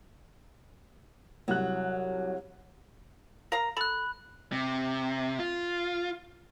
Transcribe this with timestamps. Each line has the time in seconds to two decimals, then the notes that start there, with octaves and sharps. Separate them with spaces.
1.48 C2 F#3 F#6
3.52 A#4 F5 A#5
3.77 A4 B5 F#6
4.52 C3
5.39 F4